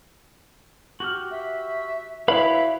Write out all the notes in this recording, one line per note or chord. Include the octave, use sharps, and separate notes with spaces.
F#4 G4 F6
E5
E4 F#4 B4 C#5 E5 F5 B5